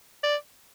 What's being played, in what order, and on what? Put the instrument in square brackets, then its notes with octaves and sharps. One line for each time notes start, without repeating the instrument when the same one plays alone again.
[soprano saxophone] D5